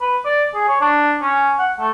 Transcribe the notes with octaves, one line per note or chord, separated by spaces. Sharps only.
B4
D5
G#4
C#5
D4
C#4
F#5
A3